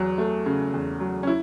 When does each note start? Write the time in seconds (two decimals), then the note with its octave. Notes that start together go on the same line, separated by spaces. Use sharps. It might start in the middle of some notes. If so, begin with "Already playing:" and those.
Already playing: E2 F#3
0.18 A3
0.46 C#3
0.74 E2
1.00 F#3
1.23 C#4
1.27 E4